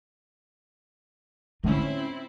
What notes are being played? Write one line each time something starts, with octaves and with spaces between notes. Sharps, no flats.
A2 D3 C4 C#4 E4 F4